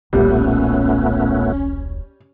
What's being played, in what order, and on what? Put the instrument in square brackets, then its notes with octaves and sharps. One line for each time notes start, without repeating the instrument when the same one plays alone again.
[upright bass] D#1 B1 [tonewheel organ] A#2 A3 B3 [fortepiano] G3 [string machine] C#4